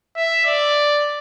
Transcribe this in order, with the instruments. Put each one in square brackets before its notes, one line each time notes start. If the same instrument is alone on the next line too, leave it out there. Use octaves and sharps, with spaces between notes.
[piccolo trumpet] E5
D5